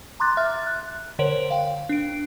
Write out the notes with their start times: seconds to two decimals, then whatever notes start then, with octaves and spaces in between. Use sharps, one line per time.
0.20 A#5 C6 D6 F#6 A6
0.37 E5 F6 A6
0.66 F#6
1.19 D3 A#4 C5 C#5 D7 F#7
1.50 F5 G5
1.89 D4 D7